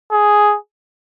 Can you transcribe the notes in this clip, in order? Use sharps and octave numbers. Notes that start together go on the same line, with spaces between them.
G#4